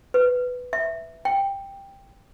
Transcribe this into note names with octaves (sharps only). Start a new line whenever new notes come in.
B4
E5
G5